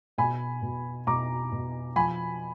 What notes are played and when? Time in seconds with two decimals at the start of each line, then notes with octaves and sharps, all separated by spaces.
0.18 B2 G#5 B5
0.62 B2
1.07 B2 A#5 D6
1.52 B2
1.96 F3 G#5 B5